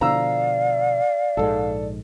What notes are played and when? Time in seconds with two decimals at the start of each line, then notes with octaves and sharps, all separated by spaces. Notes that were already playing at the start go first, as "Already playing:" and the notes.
0.01 B2 D3 F3 D5 F5 A#5 E6
1.37 A#1 G#2 G#3 A4